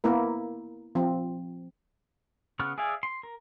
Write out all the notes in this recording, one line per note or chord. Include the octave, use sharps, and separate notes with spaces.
A#3 B3 E4 A#4
F3 C4
C#3 B3 C#6 F6 F#6
G#4 D5 E5 F5 G#5
C6
A#4